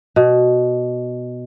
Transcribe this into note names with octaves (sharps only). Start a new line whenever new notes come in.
B2